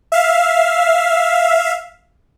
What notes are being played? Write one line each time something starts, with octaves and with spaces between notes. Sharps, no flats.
E5 F5